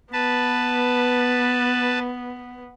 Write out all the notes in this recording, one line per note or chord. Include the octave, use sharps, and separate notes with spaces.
B3 B4 A5